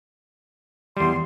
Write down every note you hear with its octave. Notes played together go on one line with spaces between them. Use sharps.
E2 G3 C6